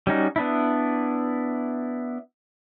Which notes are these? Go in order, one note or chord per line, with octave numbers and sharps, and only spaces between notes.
G3 C#4 D#4 F#4
B3 D4 E4